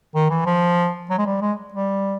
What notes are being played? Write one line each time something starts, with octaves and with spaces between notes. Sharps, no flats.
D#3
E3
F3
F#3
G#3
G3
G#3
G3